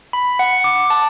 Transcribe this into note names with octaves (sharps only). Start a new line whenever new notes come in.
B5
F#5
D6
A5